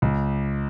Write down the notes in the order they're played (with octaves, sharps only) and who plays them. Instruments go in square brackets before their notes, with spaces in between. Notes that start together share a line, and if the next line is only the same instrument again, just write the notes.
[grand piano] C#2